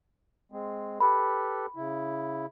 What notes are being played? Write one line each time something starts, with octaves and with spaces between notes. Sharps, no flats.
G#3 C4
G4 A4 B4 B5
C#3 E4